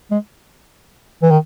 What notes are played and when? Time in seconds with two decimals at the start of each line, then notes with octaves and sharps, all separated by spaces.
0.11 G#3
1.22 E3
1.31 D#3